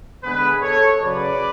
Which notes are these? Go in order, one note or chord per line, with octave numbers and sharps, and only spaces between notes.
D3 G#3 B3 G#4 B4
A4 C#5
C#3 F#3 C#4 B4 D5